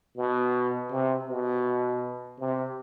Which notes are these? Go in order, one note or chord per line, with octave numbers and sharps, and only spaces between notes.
B2
C3
B2
C3